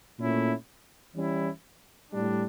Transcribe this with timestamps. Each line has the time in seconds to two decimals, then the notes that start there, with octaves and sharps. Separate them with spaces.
0.19 A#2 A3 C#4 E4
1.15 E3 G3 C#4 E4
2.12 A2 G3 D4